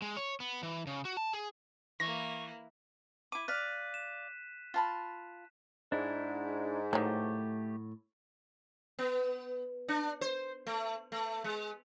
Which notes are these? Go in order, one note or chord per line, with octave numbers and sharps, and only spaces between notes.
G#3
C#5
B3
E3
C#3
F#4
A5
G#4
E3 A#3 E4 C#6 A#6
E4 D6 D#7
D5 F5 F#6 B6
E7
F4 A5 B5
G#2 D4 E4
A2 D#3 F#3 A3 G4
B3
D4
C5
A3
A3
G#3